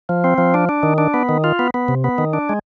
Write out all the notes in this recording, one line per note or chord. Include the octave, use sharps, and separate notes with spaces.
F3
C4
F3
D4
D4
D#3
D4
B3
D#3
F4
B3
B3
C3
B3
D#3
D4
G#3